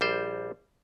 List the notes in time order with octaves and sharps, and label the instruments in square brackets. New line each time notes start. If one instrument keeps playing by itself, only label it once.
[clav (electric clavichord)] A#1 G3 C5